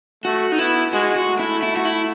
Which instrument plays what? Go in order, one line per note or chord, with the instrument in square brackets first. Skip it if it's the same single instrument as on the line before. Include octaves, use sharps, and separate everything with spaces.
[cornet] A3 [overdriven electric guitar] F#4
[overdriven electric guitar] D#4
[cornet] B3 [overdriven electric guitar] E4
[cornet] G#3 [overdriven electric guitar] F#4
[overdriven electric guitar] F#4
[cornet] A3
[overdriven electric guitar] E4
E4
F#4
E4